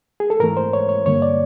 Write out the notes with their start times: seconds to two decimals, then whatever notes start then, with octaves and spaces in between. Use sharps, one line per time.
0.20 G#4
0.30 A4
0.40 G#2 E3 A3 A#4
0.57 C5
0.73 C#5
0.89 C#5
1.06 G2 D3 G3 A#3 C#5
1.22 D5